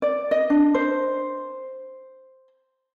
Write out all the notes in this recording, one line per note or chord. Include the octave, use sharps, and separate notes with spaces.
D5
D#5
D4
C5